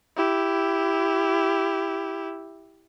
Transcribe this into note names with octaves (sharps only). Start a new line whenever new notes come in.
E4 G4